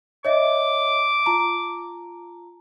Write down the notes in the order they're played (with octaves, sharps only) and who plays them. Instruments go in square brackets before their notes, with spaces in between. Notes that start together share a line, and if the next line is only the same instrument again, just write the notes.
[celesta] C#5 D#5 E5 [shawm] D6
[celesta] F4 A5 A#5